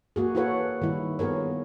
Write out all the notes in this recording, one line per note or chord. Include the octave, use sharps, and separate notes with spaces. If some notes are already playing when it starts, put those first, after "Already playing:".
A#3 F#4 G#4
E4 F#4 A4 B4 C#5 F#5
D#3 G3 E4
B3 F4 G#4 A#4 C#5